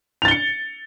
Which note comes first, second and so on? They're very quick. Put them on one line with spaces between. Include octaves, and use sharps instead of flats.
F7 A6 G7 C#7